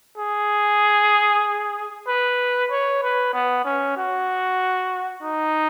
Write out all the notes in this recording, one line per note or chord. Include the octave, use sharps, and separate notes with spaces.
G#4
B4
C#5
B4
B3
C#4
F#4
D#4